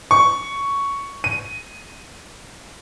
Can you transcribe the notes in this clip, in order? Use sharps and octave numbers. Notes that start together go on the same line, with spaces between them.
C#6
D#7